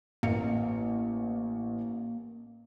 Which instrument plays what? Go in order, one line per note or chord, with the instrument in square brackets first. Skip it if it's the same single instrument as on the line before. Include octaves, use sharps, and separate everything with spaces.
[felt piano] A1 C#7 [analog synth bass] A#3